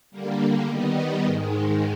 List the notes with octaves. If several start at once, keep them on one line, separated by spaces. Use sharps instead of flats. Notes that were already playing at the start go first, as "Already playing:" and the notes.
D3 G3 A#3
D#3 G3 B3 D#4
G#2 D#3 G#3